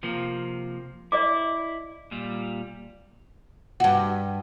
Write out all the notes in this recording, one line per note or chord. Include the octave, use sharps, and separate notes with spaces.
C3 F3 A#3
E4 D5 D#5 D6
A#2 G3
G2 F#4